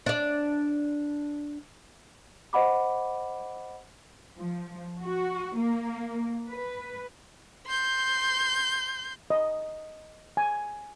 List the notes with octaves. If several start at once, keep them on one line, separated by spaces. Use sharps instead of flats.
D4 D5
C5 D#5 F#5 B5 D6
F3
F#4
A#3
B4
C6 G6
D#5
G#5